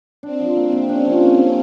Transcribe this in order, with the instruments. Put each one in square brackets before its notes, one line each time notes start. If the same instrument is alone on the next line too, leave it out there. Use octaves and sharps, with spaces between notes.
[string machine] C4 [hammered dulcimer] D4
[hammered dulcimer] F3
A#3
C3
[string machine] C#4 [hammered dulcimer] D4
[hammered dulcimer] F3
A#3
C3